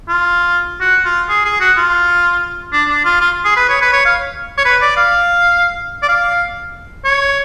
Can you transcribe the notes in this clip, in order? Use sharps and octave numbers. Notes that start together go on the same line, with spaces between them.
F4
F#4
F4
G#4
G#4
F#4
F4
D4
D4
F4
F4
G#4
B4
C#5
B4
C#5
F5
C#5
B4
D5
F5
D5
F5
C#5